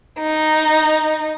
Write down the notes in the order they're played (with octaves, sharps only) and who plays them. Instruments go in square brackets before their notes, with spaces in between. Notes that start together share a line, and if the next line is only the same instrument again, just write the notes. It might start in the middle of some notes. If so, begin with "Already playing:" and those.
[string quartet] D#4